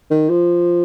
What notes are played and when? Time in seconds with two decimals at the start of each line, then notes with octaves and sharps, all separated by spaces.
0.11 D#3
0.29 F3